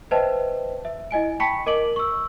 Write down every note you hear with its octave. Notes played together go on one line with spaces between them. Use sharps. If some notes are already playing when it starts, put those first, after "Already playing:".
B4 C5 D#5 E5 G5 A5
E5
E4 D#5 G#5 D7
G5 A5 B5 C#6 B6 C#7
A#4 D#5 D6 D7 F#7
C#6 E6